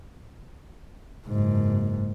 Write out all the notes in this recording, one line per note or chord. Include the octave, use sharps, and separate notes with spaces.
F#1 G#2